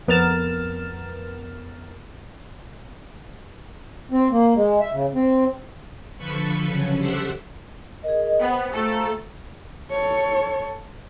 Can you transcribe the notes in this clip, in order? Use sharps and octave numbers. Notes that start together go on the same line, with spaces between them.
F2 B3 A#4 F6 A6 E7
C4
A#3
G#3
E5
C#3
C4
D3 F3 A4 B4 B5 C#6
C#3 F#3 C#4
G3 G4 A4 C5 E5 F#5
G#4 A#4 D#5
B3 C5 G5
A3 F4 A4 A#5
A4 C#5